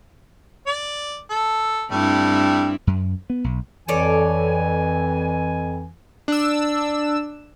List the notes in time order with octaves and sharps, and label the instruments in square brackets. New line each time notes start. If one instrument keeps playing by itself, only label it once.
[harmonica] D5
A4
[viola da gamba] G2 C4 E4 [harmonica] G3 A3
[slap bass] F#2
B3
B1
[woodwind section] F2 E3 G#5 [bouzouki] A4 C#5 D5
[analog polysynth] D4 E6